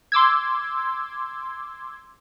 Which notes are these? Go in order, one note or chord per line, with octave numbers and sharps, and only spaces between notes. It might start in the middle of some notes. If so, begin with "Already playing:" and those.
C6 D6 E6 G#6